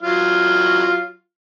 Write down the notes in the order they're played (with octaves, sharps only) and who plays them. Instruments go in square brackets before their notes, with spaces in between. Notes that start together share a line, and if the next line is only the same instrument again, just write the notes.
[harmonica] F#3 F4 F6